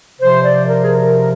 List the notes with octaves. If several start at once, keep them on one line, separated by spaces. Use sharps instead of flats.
C3 F3 C5
D5
A#4
G#4
A#4